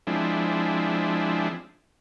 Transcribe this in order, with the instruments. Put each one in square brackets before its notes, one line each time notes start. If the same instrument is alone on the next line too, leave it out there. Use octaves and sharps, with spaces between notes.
[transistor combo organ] F3 G#3 C4 D4 E4